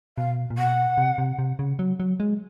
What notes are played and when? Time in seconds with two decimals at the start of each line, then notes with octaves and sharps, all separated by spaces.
0.18 B2 F5
0.50 A#2
0.58 B2 F#5
0.98 C3
1.18 C3
1.39 C3
1.59 C#3
1.79 F#3
2.00 F#3
2.20 G#3